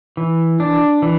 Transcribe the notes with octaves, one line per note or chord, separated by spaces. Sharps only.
E3
D4
E3